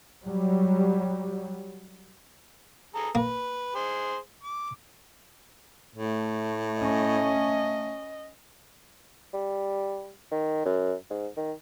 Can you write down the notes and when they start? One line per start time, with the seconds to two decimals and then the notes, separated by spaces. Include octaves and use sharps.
0.24 F#3 G3
2.95 G#4 A4 A#5
3.15 A#3 B4
3.75 G#4 C5
4.43 D6
5.95 A2 A3
6.81 C#4 D#5
9.34 G3
10.32 D#3
10.66 F#2
11.10 G#2
11.37 D#3